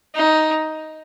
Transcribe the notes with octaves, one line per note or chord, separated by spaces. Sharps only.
D#4